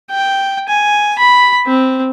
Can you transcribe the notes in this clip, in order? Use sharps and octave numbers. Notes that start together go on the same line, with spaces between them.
G5
G#5
B5
C4